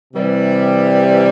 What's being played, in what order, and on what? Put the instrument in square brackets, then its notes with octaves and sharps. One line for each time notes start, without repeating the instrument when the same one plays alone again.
[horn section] C3 E3 G3